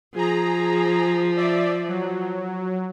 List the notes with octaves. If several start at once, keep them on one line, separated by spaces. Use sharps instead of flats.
F3 G#4 A#5
D5 E5
F#3